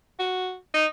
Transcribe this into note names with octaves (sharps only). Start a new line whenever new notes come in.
F#4
D#4